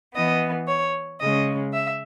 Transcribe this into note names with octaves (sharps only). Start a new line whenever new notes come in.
E3 B3 D#5
C#5
C#3 G#3 C#4 D#5
E5